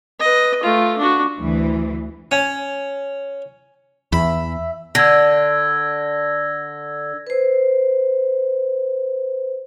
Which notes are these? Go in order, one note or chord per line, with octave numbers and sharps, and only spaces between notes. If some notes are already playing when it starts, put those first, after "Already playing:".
B4 D#5
A3 F4
D4 F#4
D2 E3
C#4 G#5
E2 E5 B5
D3 E6 G#6 A#6
B4 C5